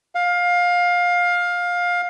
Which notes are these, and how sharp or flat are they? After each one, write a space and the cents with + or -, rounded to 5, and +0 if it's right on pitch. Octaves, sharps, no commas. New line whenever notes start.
F5 +20